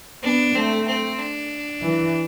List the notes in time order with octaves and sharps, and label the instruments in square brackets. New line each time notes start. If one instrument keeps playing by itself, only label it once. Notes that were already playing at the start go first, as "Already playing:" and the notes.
[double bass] B3 [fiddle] D4
[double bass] A3 [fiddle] C4
[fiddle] C4
D4
[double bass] E3